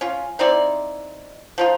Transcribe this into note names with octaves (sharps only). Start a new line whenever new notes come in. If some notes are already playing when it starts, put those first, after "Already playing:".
C#4 F4
C4 D#4 E4 D5
F3 D#4 F4